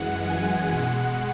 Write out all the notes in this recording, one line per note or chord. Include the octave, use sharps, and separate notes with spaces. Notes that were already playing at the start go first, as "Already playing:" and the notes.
Already playing: F#2 E3 G#3 F#5
G#5
B2 G#3 F#5